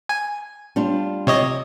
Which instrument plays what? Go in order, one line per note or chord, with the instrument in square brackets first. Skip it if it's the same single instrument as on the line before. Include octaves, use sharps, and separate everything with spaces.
[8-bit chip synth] G#5
[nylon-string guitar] G3 D4 F4
[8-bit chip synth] C3 C#5 D#5